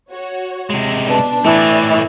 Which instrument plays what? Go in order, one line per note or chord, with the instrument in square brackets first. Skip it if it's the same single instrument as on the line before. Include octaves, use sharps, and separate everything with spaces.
[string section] F#4 C#5
[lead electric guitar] C3 G#3
[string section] B2 D4 B4
[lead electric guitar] A2 A3 [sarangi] E3 [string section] D5